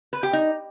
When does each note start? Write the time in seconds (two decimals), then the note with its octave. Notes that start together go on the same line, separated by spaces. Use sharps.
0.13 B4
0.23 G4
0.33 D#4